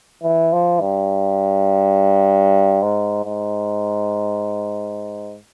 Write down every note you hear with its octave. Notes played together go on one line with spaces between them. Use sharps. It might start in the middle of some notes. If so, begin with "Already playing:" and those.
E3
F3
G2
G#2
G#2